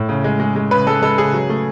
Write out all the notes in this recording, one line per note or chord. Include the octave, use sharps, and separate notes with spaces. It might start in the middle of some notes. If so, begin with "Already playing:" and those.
Already playing: A2
C#3
G#3
G#3
G#3
C#3 B4
G#3 A4
G#3 A4
C#3 G#4
F#3
A3